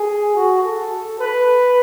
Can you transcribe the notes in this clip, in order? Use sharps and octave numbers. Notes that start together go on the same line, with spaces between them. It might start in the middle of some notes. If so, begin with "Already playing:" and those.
Already playing: G#4
F#4
A4
B4